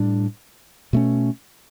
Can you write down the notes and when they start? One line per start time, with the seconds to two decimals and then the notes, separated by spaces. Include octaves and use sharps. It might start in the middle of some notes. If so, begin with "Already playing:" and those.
Already playing: A2 G3 D4
0.93 B2 A3 C#4